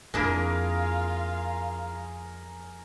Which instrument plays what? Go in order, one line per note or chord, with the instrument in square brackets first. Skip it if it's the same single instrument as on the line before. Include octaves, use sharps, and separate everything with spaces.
[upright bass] F2 [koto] A#3 D4 E4 [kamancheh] F4 F5 [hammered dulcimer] G#4 A#4